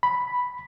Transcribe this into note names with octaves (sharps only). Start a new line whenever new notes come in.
B5